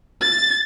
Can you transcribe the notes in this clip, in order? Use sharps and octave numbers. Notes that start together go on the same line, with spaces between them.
A6